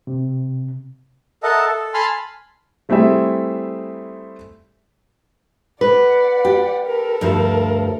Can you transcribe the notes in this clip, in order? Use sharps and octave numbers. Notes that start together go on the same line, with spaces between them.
C3
A4 A#4 D#5 E5 F#5 A5
A4
G#5 A5 B5 C6 F6
G3 A3 C4 E4 G#4 E5
B4 D5 F#5
G4
A4 A#4
D2 G2 F3